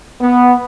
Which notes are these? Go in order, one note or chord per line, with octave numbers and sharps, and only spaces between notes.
B3